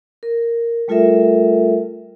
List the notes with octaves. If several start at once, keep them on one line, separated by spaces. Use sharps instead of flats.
A#4
G3 A3 F4 A4 A#4 E5